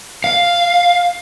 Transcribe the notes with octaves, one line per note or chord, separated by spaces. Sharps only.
F5